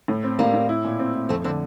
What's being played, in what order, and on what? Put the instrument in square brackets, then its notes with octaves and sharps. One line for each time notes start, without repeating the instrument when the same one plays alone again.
[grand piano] A2
C4
[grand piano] A2 [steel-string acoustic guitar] G3 A#3
[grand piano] A2
E4
A#2
C4
E4
[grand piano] F2 [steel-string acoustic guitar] A3 C4
[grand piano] D3 [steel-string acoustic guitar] C4 E4